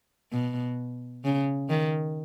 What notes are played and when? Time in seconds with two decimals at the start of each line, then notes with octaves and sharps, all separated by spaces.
0.32 B2
1.25 C#3
1.69 D#3